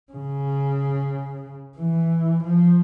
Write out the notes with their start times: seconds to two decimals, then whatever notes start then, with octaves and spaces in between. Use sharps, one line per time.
0.12 C#3
1.77 E3
2.44 F3